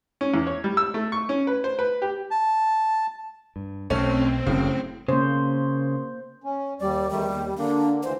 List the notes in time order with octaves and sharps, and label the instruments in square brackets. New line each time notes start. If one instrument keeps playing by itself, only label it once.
[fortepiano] C#4
E2
C#5
G3
E6
A3
C#6
C#4
B4
C5
B4
G4
[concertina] A5
[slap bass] G2
[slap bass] B1 [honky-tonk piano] A3 C#4 [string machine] C4
[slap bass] F#1 [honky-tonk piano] A2 [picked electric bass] C#3
[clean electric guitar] C#3 [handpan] A#3 C5
[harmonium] C#4
[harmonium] D#2 D5 [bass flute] G3
[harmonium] E2 D#3 A3 [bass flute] G3
[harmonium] D#2
[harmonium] D3 A#3 [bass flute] D4
[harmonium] D2 E3 [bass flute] C5